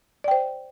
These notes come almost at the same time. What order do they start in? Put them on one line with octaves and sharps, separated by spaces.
D5 G5 C5